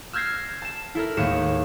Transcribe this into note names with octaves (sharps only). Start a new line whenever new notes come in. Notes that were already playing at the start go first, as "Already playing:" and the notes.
E6 F6 G6 G#6 A#6 C7
A5 E7
E4 A4 A#4
D#2 A2 G#3 G#4 C#7 E7